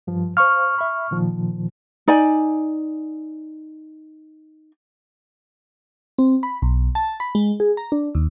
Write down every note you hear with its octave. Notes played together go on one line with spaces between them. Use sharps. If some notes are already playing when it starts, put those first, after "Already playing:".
G2 F3
C5 F5 C#6 F6
E5 B5
A#2 D#3 F3
D#4 D5 G#5
C4
B5
B1
A5
B5
G#3
G#4
A#5
D4
D#2